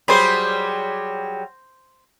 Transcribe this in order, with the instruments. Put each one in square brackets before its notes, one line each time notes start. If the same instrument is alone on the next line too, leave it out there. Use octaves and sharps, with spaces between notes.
[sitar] F#3 G3 G#4 [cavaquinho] C5 B5